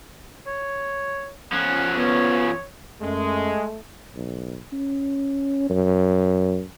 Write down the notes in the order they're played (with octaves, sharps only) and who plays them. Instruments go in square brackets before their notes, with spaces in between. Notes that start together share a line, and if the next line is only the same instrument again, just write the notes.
[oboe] C#5
[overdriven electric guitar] F3 C#4 [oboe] F#5
[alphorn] B3 [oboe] C#5
[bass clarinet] F#2 [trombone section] G#3 [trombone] A3
[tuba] B1
C#4
F#2